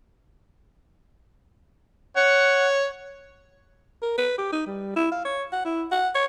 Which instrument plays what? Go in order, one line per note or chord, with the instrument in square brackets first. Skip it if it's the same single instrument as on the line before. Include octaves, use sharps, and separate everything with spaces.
[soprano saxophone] C#5 [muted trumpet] F#5
[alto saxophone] A#4
B4
G4
D#4
G3
E4
F5
C#5
F#5
E4
F#5
C#5